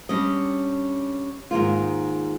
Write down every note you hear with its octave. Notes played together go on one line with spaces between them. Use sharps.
G3 C#4 D4 D#5
G#2 D#3 A#3 F4